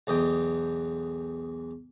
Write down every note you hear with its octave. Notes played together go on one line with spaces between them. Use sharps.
B1 E2 D#5 G5